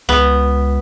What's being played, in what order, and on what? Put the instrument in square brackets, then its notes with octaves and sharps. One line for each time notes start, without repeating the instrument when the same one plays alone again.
[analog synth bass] C#2 [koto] B3